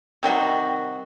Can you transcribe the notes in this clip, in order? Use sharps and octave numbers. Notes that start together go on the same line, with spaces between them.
C3 D#3 G3 F#4